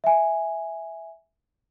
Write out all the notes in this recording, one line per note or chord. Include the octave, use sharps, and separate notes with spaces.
E5 G#5